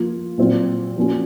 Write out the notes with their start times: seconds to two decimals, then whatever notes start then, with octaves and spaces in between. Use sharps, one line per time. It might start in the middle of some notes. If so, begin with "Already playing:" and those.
Already playing: F3 A#3 F4
0.38 A#2 F#3 C4 F4
0.96 F3 A#3 C#4 F#4